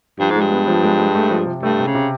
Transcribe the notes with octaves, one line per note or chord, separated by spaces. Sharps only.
G2 F3
G#2
G2 G#3
B3
F3
G#3
G#3
A3
F3
C3
G2 A3
C3
C#3
C3